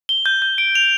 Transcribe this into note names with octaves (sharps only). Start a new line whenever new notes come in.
G7
G6
G6
D7
F7